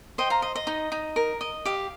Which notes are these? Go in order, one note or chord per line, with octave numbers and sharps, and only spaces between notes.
C5 D#5 G5
F5 A#5
D#5
D#5
D#4
D#4
A#4
D#5
G4 F5